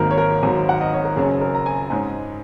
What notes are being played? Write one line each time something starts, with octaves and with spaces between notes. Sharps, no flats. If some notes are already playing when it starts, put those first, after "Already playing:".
Already playing: G#1 G#2 D#3 F#3 A#3 A#4
C#5
A#4
G#1 G#2 F#3
F#5
D#5
C#5
A#4
F#1 F#2 F#3 C#4 G#4
A#4
A#5
G#5
G#2 G#3 C#4